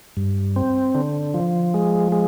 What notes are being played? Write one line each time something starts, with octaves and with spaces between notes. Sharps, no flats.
G2
C4
D3
F3
G#3
G#3